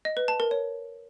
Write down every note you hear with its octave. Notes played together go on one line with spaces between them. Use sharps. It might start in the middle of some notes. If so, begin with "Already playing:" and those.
D#5
B4
A5
A#4
C#5